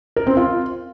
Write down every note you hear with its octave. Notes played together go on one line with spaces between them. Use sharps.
A#4
C4
F4